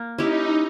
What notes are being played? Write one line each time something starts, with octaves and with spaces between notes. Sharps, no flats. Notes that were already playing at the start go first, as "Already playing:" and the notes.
Already playing: A#3
C#4 D#4 E4 G4